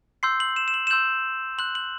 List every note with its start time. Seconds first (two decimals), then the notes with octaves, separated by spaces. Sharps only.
0.23 C6 E6 G6 C7
0.40 F#7
0.56 E7
0.68 E7
0.74 F#7
0.87 E7
0.90 C6 E6 G6 F#7
1.58 C6 F#6 F#7
1.75 F#7